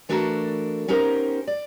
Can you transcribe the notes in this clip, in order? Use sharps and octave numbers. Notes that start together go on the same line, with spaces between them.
E3 A3 D4 F#4 A4 A#4
B3 C#4 D#4 G4 A#4 C5
D5